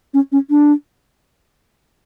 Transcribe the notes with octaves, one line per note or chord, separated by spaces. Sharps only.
C#4
C#4
D4